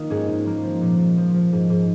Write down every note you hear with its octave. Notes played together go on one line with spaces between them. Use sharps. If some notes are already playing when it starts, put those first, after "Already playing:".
Already playing: D#3 A#3 D#4 F4
G#2 G#3 C#4
G#2
F3 A#3
F3
A#2
A#2
F3
F3
G#2
G#2